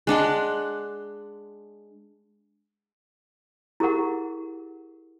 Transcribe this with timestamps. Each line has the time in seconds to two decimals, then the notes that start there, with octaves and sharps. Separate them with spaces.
0.07 G#3 D4 F#5 C6
3.80 E4 G4 G#4 A#4 F#5